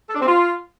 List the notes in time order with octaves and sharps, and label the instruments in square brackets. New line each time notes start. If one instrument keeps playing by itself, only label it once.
[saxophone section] A4
D4
C4
F4